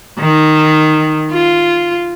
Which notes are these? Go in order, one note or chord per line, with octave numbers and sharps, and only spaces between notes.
D#3
F4